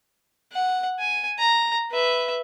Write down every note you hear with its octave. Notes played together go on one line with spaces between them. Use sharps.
F#5
G#5
A#5
B4 E5